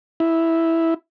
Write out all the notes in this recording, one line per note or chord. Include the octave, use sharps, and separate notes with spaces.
E4